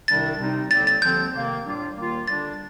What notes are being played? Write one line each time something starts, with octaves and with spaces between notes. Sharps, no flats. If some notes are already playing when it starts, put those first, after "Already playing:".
C2 C3 D#3 G3 D4 A6
C3 G3 C4 D#4
D#2 D3 G3 C4 A6
A6
D#2 D3 F3 C4 G6
C3 D#3 A#3
A2 G3 D4 F4
D#2 D#3 A#3 F4
D3 G3 D4 A6